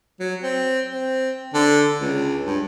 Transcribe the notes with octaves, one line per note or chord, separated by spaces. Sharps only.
F#3
C4
C4
D3
C#2
G2